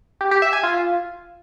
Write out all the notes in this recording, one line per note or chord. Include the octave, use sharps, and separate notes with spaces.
G4
G4
E5
G#5
F4